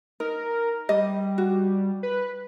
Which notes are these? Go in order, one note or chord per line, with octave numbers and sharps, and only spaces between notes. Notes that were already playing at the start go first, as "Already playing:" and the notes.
D#4 A#4
G3 D#5
F#4
B4